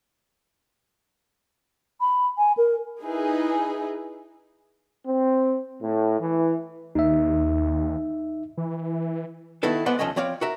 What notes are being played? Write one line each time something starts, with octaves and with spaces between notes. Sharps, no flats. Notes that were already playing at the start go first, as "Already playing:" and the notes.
B5
G#5
A#4
D#4 E4 G#4 B4
C4
A2
E3
D#2 D#4 E5
E3
D#3 B3 E4 F#4 A4 B4
G#3 B3 B4 C5 D5 F#5
D2 E3 F3 A3 C#4 D#5
F3 C4 C#5 D5 F5
F#4 A#4 E5